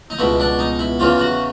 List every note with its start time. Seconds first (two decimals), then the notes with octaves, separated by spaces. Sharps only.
0.10 D#4
0.19 C#2 B2 E4
0.40 D4
0.59 D#4
0.79 E4
0.99 E2 C#3 E3 F4
1.19 F#4